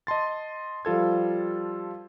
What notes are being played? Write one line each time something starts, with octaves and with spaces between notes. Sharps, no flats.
D#5 A5 C6 A6
F3 G3 F4 A4 G#6